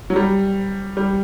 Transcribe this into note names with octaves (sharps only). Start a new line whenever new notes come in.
F#3
G3
G3